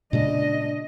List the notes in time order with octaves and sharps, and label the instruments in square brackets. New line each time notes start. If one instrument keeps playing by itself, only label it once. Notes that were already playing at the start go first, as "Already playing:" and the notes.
[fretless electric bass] A#2 C#3 G#3 [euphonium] D4 [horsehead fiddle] D#5